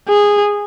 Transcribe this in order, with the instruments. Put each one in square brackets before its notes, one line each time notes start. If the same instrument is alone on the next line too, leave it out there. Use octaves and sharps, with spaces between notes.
[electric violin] G#4